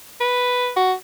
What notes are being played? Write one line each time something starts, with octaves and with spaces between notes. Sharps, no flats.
B4
F#4